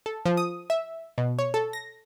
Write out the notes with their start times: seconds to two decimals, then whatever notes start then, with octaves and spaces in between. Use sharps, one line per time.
0.06 A4
0.26 F3
0.37 D#6
0.70 E5
1.18 B2
1.39 C#5
1.54 A4
1.73 A#6